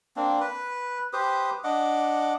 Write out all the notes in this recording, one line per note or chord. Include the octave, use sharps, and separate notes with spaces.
A#3 C4 D4
B4
G4 B4 C5 D#6
D4 D#5 F#5 D6